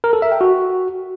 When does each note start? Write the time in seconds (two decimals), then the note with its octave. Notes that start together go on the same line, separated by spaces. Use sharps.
0.04 A#4
0.13 A4
0.22 E5
0.31 G5
0.41 F#4